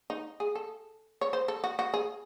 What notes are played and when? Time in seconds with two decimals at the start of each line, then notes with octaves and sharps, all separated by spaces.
0.10 D#4
0.40 G#4
0.55 A4
1.21 C#5
1.33 C5
1.48 A4
1.64 F#4
1.79 F#4
1.94 G#4